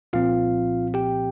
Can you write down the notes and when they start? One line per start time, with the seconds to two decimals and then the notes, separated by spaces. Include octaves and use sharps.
0.13 C2 A#2 F3 C4 F4 F5
0.94 G4 G5